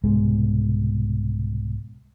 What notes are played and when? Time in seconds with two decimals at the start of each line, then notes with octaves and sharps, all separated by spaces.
0.04 C2 G#2 B2 G#3